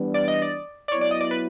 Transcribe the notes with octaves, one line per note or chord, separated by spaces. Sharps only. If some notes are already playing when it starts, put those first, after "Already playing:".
Already playing: E3 G3 B3 D4
D5
D#5
D5
D5
F#3 B3 E4 C#5
D5
D#5
D5
B4